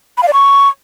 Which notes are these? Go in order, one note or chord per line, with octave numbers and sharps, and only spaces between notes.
B5
F5
D5
C#6